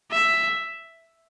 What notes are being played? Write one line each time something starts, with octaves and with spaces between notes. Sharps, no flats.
E5